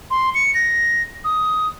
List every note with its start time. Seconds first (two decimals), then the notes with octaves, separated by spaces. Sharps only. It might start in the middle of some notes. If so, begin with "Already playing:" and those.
0.11 C6
0.34 C#7
0.54 A#6
1.24 D#6